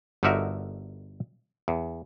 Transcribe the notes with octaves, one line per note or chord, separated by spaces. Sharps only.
G1 D3 D#4 F#4 A#4 E5
E2